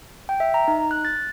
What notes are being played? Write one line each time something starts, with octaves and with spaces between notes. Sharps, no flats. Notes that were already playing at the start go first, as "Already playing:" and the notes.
G5
E5
A#5
D#4
F#6
A6